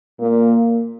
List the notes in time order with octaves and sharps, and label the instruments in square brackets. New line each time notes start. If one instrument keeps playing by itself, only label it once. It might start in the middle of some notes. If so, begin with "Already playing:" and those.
[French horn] A#2 [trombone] A#3